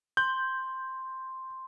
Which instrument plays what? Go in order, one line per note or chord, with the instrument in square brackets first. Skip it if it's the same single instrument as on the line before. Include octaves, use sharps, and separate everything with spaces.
[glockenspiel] C6 [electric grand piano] G6